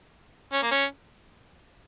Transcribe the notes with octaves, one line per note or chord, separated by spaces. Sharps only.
C#4
A#3
C#4